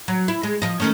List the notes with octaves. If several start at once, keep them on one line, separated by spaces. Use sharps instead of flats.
F#3
E4
G#3
F3 D#5
D#3 A3 C#4